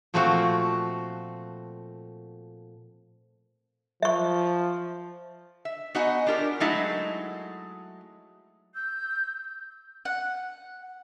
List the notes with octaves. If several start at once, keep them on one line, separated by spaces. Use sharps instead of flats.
A#2 F3 A3 C4 F#4 F5
F3 E5 C#6
E5
B3 D#4 F#4 D#5 F#5 G#5
D4 F4 G4 A#4
F#3 G#3 A3 D#4 E4 F#4
E6 G6
F#5